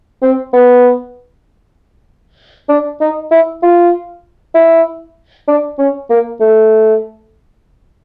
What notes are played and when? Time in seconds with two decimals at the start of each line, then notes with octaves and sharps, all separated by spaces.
0.22 C4
0.53 B3
2.69 D4
3.00 D#4
3.31 E4
3.62 F4
4.55 E4
5.48 D4
5.78 C#4
6.10 A#3
6.40 A3